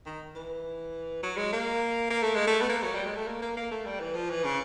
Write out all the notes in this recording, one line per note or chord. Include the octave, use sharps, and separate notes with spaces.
D#3
E3
F#3
G#3
A#3
A#3
A3
G#3
A3
B3
A#3
F#3
G3
G#3
A3
A#3
A#3
A#3
A3
G3
E3
F3
E3
C#3